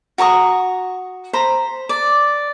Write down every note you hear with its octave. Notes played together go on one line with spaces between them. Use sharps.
F#4 A#5 C#6 D#6
C5 A#5 B5
D5